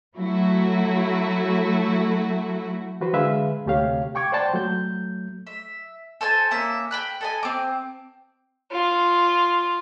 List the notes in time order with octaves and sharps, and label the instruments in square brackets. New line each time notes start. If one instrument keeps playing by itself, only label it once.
[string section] F#3 A3 E4 F#4
[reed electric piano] E3 F#4 B4 C5
D3 G#3 G#4 B4 E5 F5
D2 C3 A3 G4 C#5 F5
G5 C#6 D6 G#6
C5 D5 F#5 G5 A5 C6
F#3 A3 G6
[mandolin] E5
A4 C5 G#5 A5
A#3 C#4 E5 A#5
G5 B5 F#6
A4 D#5 G#5
C4 D6
[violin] F4